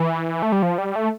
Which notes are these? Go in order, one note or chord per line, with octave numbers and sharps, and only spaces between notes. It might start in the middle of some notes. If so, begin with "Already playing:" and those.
Already playing: E3
A3
G3
F3
G3
A3